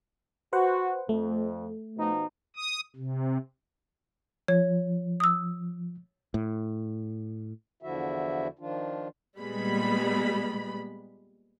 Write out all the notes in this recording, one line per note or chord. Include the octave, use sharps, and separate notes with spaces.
F#4 B4 C5 F#5
F2 A3
B2 F3 D#4
D#6
C3
F3 C#5
D#6 E6
A2
E2 D3 F3 E4 F#4 E5
D#3 F3 D4 F4
A#2 G3 G#3 B3 B5